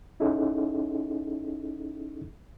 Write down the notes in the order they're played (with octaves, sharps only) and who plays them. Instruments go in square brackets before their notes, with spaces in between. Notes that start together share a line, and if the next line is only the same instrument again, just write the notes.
[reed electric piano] C#4 D#4 E4 G#4 A4